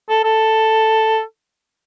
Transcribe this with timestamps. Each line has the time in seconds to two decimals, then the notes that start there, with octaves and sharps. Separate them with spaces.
0.09 A4
0.24 A4